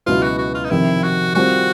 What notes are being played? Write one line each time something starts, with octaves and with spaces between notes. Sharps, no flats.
C#2 B2 F#3 B3 E4 F4
F#4
F#4
F4
D#4
F2 C3 D#3 E4
F#4
D#3 G3 C4 F4 F#4